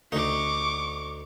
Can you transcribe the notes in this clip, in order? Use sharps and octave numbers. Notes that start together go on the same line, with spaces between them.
D2 D#4 C#6 D6